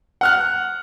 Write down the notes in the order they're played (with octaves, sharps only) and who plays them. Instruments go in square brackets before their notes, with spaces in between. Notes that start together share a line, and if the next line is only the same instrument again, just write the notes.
[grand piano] F#5 F6 F#6